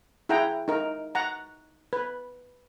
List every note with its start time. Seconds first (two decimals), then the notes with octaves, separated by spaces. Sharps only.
0.29 E4 G#4 F#5 G5 A#5
0.68 D#4 A#4
1.15 F#5 A#5
1.93 B4